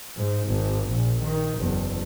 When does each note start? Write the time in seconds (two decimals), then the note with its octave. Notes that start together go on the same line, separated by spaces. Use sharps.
0.17 G#2
0.47 G#1
0.89 A#1 A#2
1.20 D#3
1.55 F#1 E2